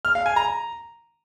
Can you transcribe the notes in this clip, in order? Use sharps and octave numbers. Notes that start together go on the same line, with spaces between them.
F6
F5
G#5
A#5